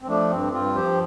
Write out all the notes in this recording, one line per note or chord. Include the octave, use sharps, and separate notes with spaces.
C4
F3 A3 D4
G2 C4
G2 C4 F4
F3 G4 C5